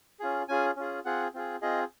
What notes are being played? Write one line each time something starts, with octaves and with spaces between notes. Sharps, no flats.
C#4 F4 G#4
C#4 F4 G#4 G#5
C#4 F4 G#4
C4 F4 G#4 F#5
C4 F4 G#4
C4 F4 G#4 D#5